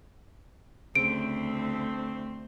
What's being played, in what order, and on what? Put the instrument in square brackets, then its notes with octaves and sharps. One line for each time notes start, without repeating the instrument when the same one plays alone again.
[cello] D2 [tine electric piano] C#3 [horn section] A3 C4 [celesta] D7